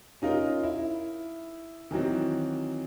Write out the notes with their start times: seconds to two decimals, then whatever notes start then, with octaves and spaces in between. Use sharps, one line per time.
0.22 C#4 D#4 F4 A#4
0.63 E4
1.91 D#3 E3 F#3 C4